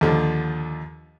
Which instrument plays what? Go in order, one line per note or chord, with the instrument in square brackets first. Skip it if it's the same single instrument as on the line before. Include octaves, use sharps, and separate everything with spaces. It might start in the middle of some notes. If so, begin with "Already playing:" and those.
[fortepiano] D#2 D3 F3